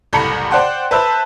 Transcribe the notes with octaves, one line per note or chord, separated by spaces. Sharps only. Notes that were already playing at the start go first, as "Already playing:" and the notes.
F#1 C2 A2 A#5 B5 C#7
C5 D5 F#5 G5 C6
B4 C5 E5 A5